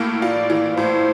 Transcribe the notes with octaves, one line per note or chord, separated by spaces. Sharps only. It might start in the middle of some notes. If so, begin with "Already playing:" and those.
Already playing: A2 A#3
F4 D5
E3
A2 C5